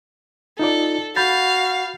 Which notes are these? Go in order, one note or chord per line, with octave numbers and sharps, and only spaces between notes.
D#4 F4 A4 D5
F#4 F5 B5 G6 A6